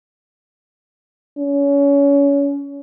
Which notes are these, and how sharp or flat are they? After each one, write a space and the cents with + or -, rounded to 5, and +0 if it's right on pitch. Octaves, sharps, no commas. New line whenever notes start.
C#4 +30